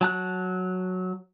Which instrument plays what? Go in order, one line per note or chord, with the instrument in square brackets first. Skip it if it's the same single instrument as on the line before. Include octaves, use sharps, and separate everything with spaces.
[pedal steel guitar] F#3 A5 F#6